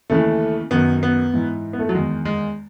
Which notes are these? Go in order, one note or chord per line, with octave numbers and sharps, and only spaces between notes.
D#2 C#3 E3 A3
F#2 D#3 B3
B3
G#2 E3
B3
A3
F#3
E2 D#3 G#3
G#3